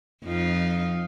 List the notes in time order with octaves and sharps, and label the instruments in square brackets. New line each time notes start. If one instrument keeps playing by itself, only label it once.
[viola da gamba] F2 D#4 F4